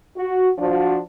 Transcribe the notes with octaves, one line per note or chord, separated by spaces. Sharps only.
F#4
F3 D4 F#4